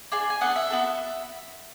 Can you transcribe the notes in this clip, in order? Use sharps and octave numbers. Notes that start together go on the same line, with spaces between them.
D4 G#4 G#5
G#5
B3 D4 A4 F#5
E5
B3 F#4 A4